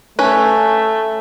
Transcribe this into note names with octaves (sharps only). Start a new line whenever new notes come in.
A3 C#4 B4